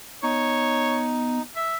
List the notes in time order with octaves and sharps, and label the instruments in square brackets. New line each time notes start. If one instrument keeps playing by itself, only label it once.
[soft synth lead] B3 [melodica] D#4 [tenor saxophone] C#5
[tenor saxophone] E5